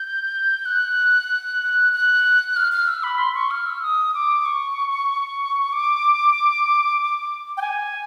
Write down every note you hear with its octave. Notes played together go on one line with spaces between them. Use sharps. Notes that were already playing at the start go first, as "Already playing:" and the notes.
Already playing: G6
F#6
F#6
F6
F6
E6
B5
C6
C#6
F6
E6
D#6
D6
C#6
D6
G5
G#5